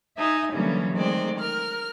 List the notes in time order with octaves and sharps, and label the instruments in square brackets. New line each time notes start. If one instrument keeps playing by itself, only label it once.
[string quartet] D#4 E5 G#5
D3 E3 F#3 G3 A#3 C#4
D#3 G#3 A3 C4 D5
A#4 F6